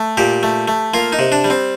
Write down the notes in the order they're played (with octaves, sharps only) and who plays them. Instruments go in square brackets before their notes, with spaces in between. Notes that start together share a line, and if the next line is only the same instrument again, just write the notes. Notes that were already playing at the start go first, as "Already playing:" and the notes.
Already playing: [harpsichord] A3
A#2 G4
A3
A3
A#3 F4
D#4
C3
D4
G3
C4